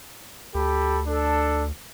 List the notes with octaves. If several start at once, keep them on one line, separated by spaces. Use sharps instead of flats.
D2 G4 A4 B5
D4 A4